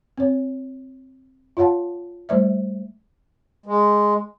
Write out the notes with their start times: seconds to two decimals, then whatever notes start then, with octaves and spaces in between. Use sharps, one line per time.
0.18 C4 C#5
1.57 F4 C#5 F5 F#5 A5
2.29 G3 A3 C5 D5 E5
3.66 G#3